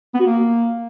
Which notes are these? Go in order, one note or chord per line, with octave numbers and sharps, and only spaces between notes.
B3
F#4
A#3